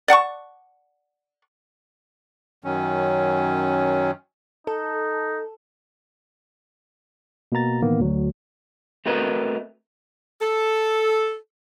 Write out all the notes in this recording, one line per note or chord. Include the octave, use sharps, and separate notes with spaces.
D5 F#5 A5 C#6
F#2 D#3 F#3 C#4
D#4 A4
B2 A#3 B3 A#5 A6
A2 D#3 E3 A#3 B3
D2 F#3
A3 C4 F#4 A#4 B4 D#5
A4